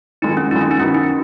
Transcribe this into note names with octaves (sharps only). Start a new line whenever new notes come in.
F2 D#3 G#3 D#4
C#4
F2 D#3 G#3 D#4
C#4
D#4
F#2 D#3 F#3 B3 C#4
D#4